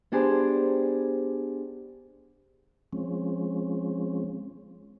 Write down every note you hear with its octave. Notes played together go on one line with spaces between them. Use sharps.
B3 D4 G4 G#4 C5
F3 G#3 C4 C#4